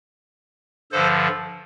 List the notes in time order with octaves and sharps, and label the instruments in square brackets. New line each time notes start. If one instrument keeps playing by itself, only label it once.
[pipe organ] G2 D3 F3 A4 C5